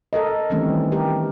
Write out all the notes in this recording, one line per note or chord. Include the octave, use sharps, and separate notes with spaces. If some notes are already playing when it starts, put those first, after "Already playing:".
A4 A#4 D#5
D#3 E3 G3 A3 C4 C#4
G4 A#4